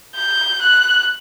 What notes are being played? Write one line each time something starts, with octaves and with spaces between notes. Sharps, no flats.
G6
F#6